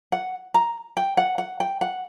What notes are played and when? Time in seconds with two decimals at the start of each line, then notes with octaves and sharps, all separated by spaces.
0.12 F#5
0.54 A#5
0.97 G5
1.17 F#5
1.38 F#5
1.60 G5
1.81 F#5